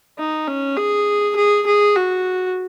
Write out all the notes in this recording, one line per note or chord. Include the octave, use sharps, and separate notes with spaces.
D#4
C#4
G#4
G#4
G#4
F#4